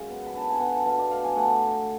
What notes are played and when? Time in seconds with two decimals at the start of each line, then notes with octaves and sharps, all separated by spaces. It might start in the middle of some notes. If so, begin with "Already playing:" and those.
Already playing: F#2 G#3 F5
0.10 B3
0.27 B5
0.35 D3 A5
0.50 G#5
0.60 B2 F#5
0.73 A5
0.86 B2 F5
0.98 D5
1.11 A3 F5
1.24 G#5
1.36 A3 F#5